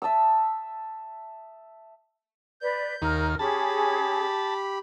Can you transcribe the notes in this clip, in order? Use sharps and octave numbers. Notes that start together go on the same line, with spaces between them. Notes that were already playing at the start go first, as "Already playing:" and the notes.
E5 A5 D#6 E6
B4 D5 G6
D#2 A#4 F6
C#4 G4 G#4 A5 B5